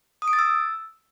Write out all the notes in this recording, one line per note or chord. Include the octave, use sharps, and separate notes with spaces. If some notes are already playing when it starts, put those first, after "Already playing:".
D#6
D7
A6
E6